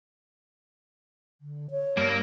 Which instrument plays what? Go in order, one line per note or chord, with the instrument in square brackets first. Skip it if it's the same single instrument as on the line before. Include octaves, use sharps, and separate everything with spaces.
[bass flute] D3
C#5
[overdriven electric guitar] G2 [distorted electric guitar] A#3 A#4